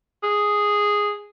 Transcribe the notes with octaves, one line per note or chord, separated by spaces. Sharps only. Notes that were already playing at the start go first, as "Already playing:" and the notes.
G#4